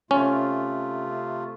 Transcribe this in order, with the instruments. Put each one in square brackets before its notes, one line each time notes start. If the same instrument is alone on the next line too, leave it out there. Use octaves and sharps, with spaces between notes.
[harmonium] C3 A3 F4 [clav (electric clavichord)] C#4